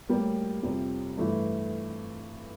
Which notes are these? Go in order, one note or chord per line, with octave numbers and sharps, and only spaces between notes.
A2 G3 A#3
F2 C3 G3
G2 E3 A3 E4